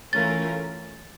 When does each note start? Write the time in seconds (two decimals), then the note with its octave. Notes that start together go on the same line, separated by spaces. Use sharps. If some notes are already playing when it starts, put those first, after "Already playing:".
0.13 E3 A3 C#4 F4 A#4 A6